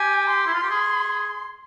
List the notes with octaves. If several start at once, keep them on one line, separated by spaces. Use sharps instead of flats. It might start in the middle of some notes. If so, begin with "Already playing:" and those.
Already playing: G4 G#5
C6
E4
F4
G4
G#4